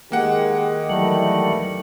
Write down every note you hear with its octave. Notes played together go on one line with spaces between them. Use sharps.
D#3 G#3 A#3 G4 F#5
E3 F#3 G3 A3